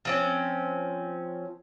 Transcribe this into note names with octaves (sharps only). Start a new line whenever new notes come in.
F3 C4 C#4